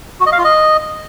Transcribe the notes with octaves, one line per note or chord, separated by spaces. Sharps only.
F#4
D#5
F5
F4
D#5